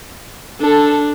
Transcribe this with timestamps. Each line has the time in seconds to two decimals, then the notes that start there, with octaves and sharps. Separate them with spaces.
0.60 D4 A4